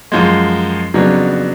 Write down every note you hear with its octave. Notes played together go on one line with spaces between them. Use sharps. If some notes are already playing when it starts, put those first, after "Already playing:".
F#2 F3 G#3
F2 C#3 F#3 B3 D4